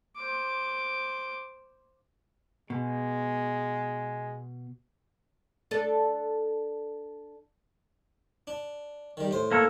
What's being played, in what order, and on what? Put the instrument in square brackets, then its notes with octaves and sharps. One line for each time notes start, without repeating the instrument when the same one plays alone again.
[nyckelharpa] C5 D6
[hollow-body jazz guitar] B2 [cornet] G#3
[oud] D4 A4
[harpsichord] D4
D#3 G3
A2 C5
[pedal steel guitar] A#3 A4 C#5